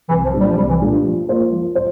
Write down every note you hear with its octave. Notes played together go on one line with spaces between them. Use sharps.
C2 E3
F3
A#2 A3 D4 G4
G3
F3
C2 G3
E3
A#2 A3 D4 G4
G2
F3
A#3 F4 C5
F3
C5